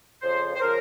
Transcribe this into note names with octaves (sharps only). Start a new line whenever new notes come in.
F2 C#3 F3 C5
C5
C#3 F3 A#4